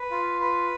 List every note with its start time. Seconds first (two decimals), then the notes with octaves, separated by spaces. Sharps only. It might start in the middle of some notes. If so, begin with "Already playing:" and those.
Already playing: B4
0.11 F4
0.40 B4